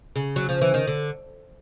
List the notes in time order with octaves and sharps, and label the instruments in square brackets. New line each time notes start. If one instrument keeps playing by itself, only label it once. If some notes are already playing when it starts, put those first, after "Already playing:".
[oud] C#3
F#3
F3
E3
D#3
D3